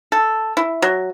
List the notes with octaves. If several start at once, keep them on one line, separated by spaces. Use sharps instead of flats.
A4
E4
F#3